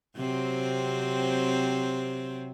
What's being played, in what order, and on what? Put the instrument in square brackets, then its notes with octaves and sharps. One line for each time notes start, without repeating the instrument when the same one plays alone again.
[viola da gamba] C3 F#3 C4